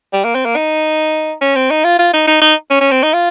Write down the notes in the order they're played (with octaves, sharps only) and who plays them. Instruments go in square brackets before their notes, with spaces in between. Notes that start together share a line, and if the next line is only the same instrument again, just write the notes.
[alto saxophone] G3
A#3
C4
A#3
D#4
C#4
C4
D#4
F4
F4
D#4
D#4
D#4
C#4
C#4
C4
D#4
F4